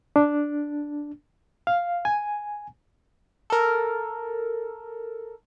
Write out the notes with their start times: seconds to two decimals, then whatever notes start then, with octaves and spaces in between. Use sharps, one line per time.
0.16 D4
1.67 F5
2.05 G#5
3.50 A4 A#4